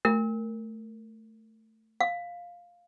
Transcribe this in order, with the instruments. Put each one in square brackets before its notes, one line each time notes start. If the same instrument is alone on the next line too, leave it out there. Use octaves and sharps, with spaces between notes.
[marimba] A3 [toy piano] A#4
[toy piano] F5